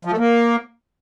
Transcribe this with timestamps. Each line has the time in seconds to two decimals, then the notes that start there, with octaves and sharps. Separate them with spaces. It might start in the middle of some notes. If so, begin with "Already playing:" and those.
0.05 F3
0.12 A3
0.18 A#3